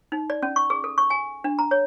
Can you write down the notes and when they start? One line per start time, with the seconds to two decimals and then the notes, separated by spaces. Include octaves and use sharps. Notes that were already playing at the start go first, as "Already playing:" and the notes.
0.12 D#4
0.30 D5
0.43 C#4
0.56 C#6
0.70 G#4
0.84 A4
0.98 C#6
1.10 G#5
1.44 D4
1.59 A#5
1.71 C#5